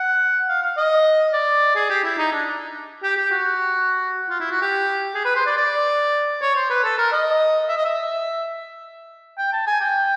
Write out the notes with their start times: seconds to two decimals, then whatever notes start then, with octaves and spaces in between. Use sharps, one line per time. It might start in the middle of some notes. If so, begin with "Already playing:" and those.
Already playing: F#5
0.49 F5
0.62 F5
0.77 D#5
1.33 D5
1.75 G#4
1.90 G4
2.04 E4
2.18 D#4
2.32 D4
3.03 G4
3.17 G4
3.31 F#4
4.30 F4
4.40 E4
4.51 F#4
4.62 G4
5.15 G#4
5.25 B4
5.36 C5
5.46 D5
5.57 D5
6.42 C#5
6.56 C5
6.70 B4
6.84 A4
6.98 A#4
7.12 D#5
7.69 E5
7.77 D#5
7.85 E5
9.38 G5
9.53 A5
9.67 G#5
9.81 G5